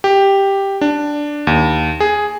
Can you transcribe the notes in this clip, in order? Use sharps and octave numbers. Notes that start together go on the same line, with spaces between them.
G4
D4
D#2
G#4